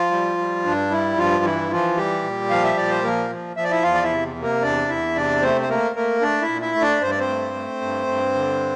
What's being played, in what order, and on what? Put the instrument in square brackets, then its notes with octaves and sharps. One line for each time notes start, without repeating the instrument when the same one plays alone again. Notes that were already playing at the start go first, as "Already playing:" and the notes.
Already playing: [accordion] F3 F4
G3
G3
G2 D4
G3 E4
G2 F3 F4
E3 E4
E3 F3 F4
G3 G4
A#2
F3 F5
E5
A#2 D5
C5
F3 A#3 A#4
F3
F3 E5
D5
E4 E5
E2 F4 F5
D5
E4 E5
C3
C3
A#3 A#4
E2 D4 D5
E2 E4 E5
C3 D4 D5
A3 C4 C5
C5
A3 A#3 A#4
A3 A#3 A#4
A3 D4 D5
E4 E5
A#2
E4 E5
A3
D4 D5
G2 C5
D5
C4 C5
A3
A3
G2
G2
D3